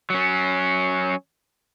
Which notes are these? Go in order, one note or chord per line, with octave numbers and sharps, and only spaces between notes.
F#3 C#4